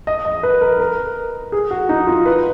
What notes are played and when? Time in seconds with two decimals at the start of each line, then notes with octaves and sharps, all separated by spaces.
0.07 D#5
0.25 D#5
0.43 B4
0.61 A#4
0.80 A#4
1.52 G#4
1.71 F#4
1.89 D#4
2.07 F4
2.26 B4